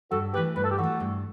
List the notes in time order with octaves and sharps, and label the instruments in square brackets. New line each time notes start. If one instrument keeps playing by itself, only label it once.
[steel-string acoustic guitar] G2 [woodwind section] F#4 A4
[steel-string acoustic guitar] E3 A3 [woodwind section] G4 B4
[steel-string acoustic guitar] G2 [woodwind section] B4
[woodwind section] A4
G4
[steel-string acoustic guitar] E3 [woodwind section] F#4 A4
[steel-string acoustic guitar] A3
G2